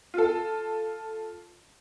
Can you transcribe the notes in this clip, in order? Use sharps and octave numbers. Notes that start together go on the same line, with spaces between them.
F4 A4